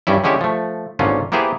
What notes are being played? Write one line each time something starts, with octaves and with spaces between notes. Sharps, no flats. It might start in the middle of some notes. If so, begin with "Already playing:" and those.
G2 G3 C#4 E4
D3 G#3 C#4 E4 G4 C#5
F3 A3
G#1 A#2 D3 C#4 F4
A#3 B3 E4 G4 G#4 C5